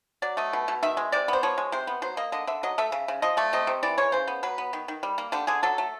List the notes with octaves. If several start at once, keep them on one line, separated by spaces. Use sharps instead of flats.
F#3 D5
A3 D#5
B2
B2
D#3 E5
G#3
C3 D5
B3 C5
F3 C#5
G#3
C3 C5
B3
F#3 C5
A#3 D#5
D3 D#5
D3 E5
F#3 D#5
A3 E5
C#3
C#3
F3 D#5
A3 D5
C3 D#5
C3
E3 D5
G#3 C#5
C#3 C5
B3
F#3 B4
B3
D#3
D#3
G3
A#3
D3 G4
D3 G#4
F#3 A4
A3